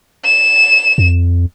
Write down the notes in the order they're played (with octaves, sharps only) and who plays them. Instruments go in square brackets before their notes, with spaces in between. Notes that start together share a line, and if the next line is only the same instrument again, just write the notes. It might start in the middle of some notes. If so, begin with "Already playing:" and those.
[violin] E7
[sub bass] F2